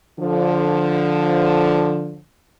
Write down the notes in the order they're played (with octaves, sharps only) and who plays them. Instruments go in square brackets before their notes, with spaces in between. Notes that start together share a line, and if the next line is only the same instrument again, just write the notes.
[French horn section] D3 F3